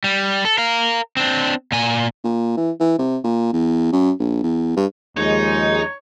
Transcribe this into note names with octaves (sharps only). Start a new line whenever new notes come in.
G3
A4
A#4 F5
C4 D4
A#2 G#5
A#2
E3
E3
C3
A#2
E2
F#2
A#1
E2
G2
D#2 F3 G#3 D#4 C#5